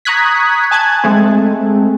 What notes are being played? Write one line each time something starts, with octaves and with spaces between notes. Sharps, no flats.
A#5 C#6 D#6 F#6 G#6 B6
G#5 A5 F#6 G#6
G#3 A3 C4